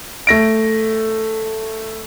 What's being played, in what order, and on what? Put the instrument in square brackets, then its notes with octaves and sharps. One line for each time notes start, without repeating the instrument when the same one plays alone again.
[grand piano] A3 A#6 D7